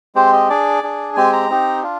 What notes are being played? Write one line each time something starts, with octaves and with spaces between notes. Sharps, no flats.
G#3 C4 G4 C5
D#5
D4 G#4 D5
D4 G#4
G#3 C4 G4 G#5
A#5
C4 D#4 G4
D4 F4